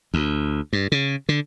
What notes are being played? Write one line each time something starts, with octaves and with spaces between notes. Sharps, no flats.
D2
G2
C#3
D3